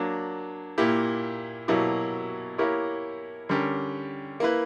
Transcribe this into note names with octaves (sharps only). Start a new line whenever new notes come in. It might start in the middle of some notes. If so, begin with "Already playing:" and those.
Already playing: F#3 A#3 D4
A#2 A#3 E4 G4
B2 F#3 A#3 E4 G4
A#3 E4 G4 A#4 C#5
D3 G3 C#4 G4 A#4
A#3 E4 B4